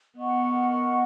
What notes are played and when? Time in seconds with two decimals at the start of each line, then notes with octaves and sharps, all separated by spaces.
0.17 B3 A#4 D#5 F#5 C#6